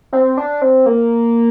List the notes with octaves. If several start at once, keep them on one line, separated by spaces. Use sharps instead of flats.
C4
D4
C4
A#3